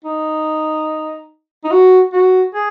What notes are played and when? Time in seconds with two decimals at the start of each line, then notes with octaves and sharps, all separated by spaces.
0.04 D#4
1.64 D#4
1.71 F#4
2.13 F#4
2.54 G#4